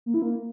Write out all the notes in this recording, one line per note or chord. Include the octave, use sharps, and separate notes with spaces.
A#3
E4
A#3